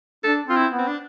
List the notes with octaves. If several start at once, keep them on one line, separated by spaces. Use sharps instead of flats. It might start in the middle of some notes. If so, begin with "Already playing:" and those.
D4 A4
C4 F4
E4
B3
C4
D4